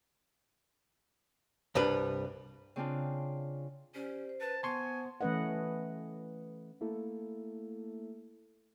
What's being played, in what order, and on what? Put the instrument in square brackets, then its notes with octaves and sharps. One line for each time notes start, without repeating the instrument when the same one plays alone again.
[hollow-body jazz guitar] C2 G2 G3 D4 B4
[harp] C#3 C4 D4 F4
[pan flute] C#4 [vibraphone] G4 C5 D5
[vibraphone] C5
[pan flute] B4 [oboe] A5
[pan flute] B3 [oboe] G#5 [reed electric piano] A5 C6 C#6
[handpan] E3 A3 C#4 B4 D#5 F#5
[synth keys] A3 A#3 E4 A4